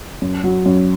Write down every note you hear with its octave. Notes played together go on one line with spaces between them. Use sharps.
F#2
F#3
F#2